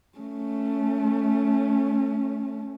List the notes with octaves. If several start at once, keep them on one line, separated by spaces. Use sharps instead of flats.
A3 C#4